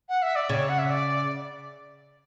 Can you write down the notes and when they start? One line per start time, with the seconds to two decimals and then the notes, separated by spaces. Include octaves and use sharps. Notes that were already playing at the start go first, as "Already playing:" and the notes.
0.09 F#5
0.22 E5
0.36 D5
0.49 C#3 C#5
0.69 F#5
0.78 E5
0.90 D5